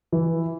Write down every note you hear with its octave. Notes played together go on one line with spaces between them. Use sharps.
E3